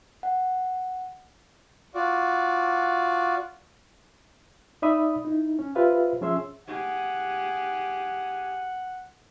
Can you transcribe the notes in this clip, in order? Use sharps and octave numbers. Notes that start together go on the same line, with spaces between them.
F#5
F4 F#4 D5
D#4 D5 E5 B5 D#6
D#4 E4
C#4
F4 G4 B4 C5 E5 F5
F3 C#4 G#4 E5 C6 E6
G4 G#4 F#5